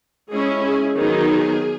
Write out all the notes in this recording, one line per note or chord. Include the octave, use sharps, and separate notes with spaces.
G#3 C#4 E4 G#4
G#4
D#3 F#3 B3 D#4 G#4